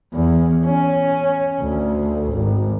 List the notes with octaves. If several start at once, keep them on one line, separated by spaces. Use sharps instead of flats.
E2
C#4
D2
G#1